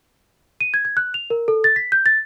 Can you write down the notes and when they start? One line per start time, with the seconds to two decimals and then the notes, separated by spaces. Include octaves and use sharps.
0.61 D#7
0.74 G#6
0.85 G#6
0.97 F#6
1.14 F7
1.30 A#4
1.48 A4
1.64 A6
1.76 B6
1.92 G6
2.06 A6